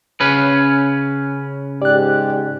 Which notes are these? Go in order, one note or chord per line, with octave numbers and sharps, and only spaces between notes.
C#3 C#4 B4
G#2 G4 D5 F#6